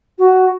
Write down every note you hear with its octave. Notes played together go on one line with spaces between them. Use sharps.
F#4